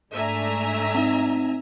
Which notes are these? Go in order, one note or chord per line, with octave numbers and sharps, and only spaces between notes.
G#2 A3 D4 E5 G#5 A#5
C4 D#4